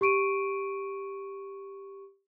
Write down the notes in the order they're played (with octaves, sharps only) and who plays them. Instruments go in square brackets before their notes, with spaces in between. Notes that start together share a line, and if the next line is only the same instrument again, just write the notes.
[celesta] G4 C#6 D7 D#7